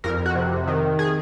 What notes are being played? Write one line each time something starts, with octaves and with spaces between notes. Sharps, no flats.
F2 A#4
F#4
C3
D#3
G#4